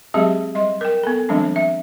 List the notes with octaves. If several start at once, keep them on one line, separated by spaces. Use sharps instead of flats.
F#3 G#3 C4 G4 G#4 E5
G3 D#5 C6
A#4 G5
B3 A4
D#3 F3 G3 G#3 C4 D4
E5